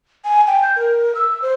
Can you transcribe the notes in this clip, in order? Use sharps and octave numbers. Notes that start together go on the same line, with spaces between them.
G#5
G5
G6
A#4
E6
C5